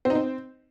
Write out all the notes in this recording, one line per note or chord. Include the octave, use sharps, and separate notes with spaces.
C4
D#4
C4